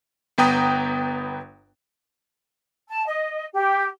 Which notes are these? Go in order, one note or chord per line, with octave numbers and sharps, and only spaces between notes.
G1 B3 B4 G5 A#5 D#6
A5
D#5
G4